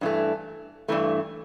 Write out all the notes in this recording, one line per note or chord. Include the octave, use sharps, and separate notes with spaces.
G2 E3 A3
G2 E3 A3